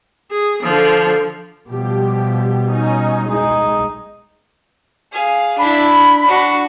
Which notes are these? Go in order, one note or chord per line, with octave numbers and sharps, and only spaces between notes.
G#4
D3 F3
B2 F3 G3 G4
C#4 D#4
G#3 D#4 G#4
G#4 F5
D4 E4 B5
D4 F#4